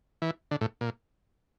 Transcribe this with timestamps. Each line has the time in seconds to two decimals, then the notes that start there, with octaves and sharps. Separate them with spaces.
0.22 E3
0.51 D3
0.61 A2
0.81 A#2